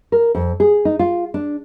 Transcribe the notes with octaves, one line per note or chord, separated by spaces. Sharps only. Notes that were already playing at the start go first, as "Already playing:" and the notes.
A#4
F2
G#4
D#4
F4
D4